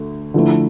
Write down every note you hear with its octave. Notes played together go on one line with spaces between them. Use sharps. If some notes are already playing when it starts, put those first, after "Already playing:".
Already playing: D2
D3 F3 A3 E4